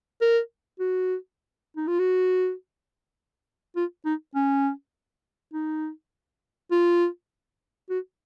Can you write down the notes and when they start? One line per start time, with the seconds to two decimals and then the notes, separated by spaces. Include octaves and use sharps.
0.21 A#4
0.79 F#4
1.77 D#4
1.87 F4
1.99 F#4
3.76 F4
4.05 D#4
4.35 C#4
5.53 D#4
6.71 F4
7.90 F#4